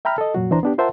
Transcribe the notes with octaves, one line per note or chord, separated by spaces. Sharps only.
E5 G5 A#5 B5 F6
A4 D#5
F2 A#2 F#3 F#4
D2 E3 D4 C5 A#5
B3 D4 G4
F4 A#4 C5 E5 F#5 A5